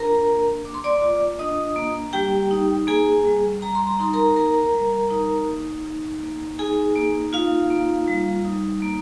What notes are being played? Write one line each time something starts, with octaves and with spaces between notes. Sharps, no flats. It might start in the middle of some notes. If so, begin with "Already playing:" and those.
Already playing: D4 F4 A#4 A#5
A#3
A#3 D6
C6
D5 D6
F4
D4 D#5 D#6
A#3
G3 G4 G5
D#4
A#3 G#4 G#5
G3
G3 A#5
C6
A#5
D#4 C6
A#4 A#5
A#3 A#4 A#5
G3
D#4
A#3
D#4
A#3
D#4 G#4 G#5
A#3
D#4 F4 F5
A#3
G3
D#4
A#3